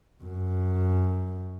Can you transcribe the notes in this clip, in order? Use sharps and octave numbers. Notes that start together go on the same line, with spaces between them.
F#2